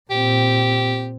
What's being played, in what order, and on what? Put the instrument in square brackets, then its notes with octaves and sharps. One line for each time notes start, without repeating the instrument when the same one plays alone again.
[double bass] A#2 C4 [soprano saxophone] G4